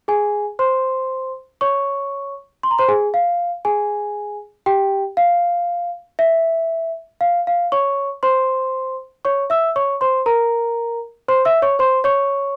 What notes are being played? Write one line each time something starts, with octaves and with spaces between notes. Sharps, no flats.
G#4 G#5
C5 C6
C#5 C#6
C6
A#5
C5 C6
G#4 G#5
F5
G#4 G#5
G4 G5
F5
E5
F5
F5
C#5 C#6
C5 C6
C#5 C#6
E5 E6
C#5 C#6
C5 C6
A#4 A#5
C5 C6
E5 E6
C#5 C#6
C5 C6
C#5 C#6